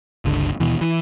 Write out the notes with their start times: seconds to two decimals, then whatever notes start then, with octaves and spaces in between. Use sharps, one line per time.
0.25 G1 C#2 D3
0.60 D#2 B2 E3
0.81 E3